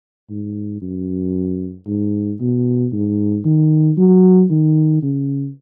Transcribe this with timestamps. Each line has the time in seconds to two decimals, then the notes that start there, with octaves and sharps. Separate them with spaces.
0.30 G#2
0.82 F#2
1.87 G#2
2.40 B2
2.93 G#2
3.45 D#3
3.97 F#3
4.50 D#3
5.03 C#3